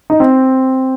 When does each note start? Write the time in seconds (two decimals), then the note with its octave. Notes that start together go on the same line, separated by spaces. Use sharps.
0.10 D#4
0.20 C4